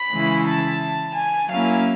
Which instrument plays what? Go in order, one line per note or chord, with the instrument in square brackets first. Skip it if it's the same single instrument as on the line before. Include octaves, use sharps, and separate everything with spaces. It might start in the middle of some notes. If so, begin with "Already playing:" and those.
Already playing: [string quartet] B5
C#3 E3 G#3 C#4 E4
A5
G#5
F#3 A#3 C#4 E4 F5